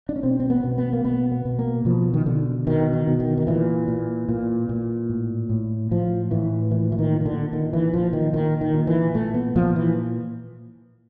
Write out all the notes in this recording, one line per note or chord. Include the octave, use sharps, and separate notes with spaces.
D4
C#4
B2 C4
C4
B3
B2
B3
A#3
B2 B3
B3
B2
A#3
B2 F3
D#3
B2 D3
B2 D#3
D#3
B2
D#3
D#3
A#2 E3
A#2
A#2
A#2
A2
A2
A2 F3
A2 E3
A#2 E3
E3
D#3
A#2
D#3
D3
A#2 D#3
E3
A#2 F3
D#3
A#2 D#3
D#3
A#2
E3
A#2 A3
B3
A#2 F3
E3